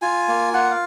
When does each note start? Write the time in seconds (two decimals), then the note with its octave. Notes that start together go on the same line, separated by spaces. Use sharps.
0.02 F4 G#5
0.28 A#3
0.54 F4 F#5
0.71 F5